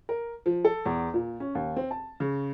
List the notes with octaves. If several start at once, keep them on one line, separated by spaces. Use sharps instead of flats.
A#4
F3
A4
E2
A#2
C#4
D#2
C4
A5
C#3